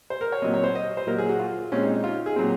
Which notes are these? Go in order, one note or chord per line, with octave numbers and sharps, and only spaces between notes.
C5
A#4
C#5
A#2 F#3 C4 D#5
C#5
C5
D#5
C5
A#2 F#3 A#3 A#4
G#4
F#4
F4
A#2 G#3 C4 C#4
D#4
D#4
F4
G#4
A#2 F#3 C4